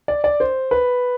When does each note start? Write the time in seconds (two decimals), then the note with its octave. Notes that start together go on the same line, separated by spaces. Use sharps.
0.08 D5
0.24 D5
0.40 C5
0.71 B4